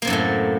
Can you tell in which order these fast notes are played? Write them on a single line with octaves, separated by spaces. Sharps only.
A#3 C3 F#2 A2 A3